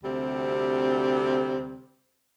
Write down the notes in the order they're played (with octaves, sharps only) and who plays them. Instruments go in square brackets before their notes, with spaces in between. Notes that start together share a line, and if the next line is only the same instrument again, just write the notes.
[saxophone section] D2 C3 G3 C4